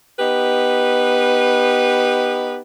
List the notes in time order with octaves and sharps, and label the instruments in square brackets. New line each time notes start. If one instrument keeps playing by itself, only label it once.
[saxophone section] B3 D#4 G4 B4